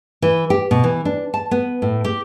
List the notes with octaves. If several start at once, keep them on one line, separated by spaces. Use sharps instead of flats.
E3
G4
B2
E3
D4
A5
B3
A2
G4